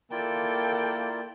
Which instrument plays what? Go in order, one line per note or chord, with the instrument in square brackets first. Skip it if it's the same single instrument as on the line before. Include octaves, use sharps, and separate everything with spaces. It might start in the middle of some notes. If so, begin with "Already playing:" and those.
[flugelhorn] A#3 [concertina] E4 F4 D5 [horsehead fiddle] A4 G5